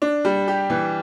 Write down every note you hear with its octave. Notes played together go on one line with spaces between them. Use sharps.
D4
G3
G4
E3